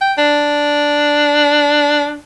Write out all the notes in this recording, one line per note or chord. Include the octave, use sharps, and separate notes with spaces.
G5
D4